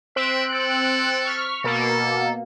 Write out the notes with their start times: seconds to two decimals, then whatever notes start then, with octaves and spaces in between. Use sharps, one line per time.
0.16 C4 E5 F#6 D7
0.52 A4
1.25 C#6 F6 B6
1.64 B2 A#3 A4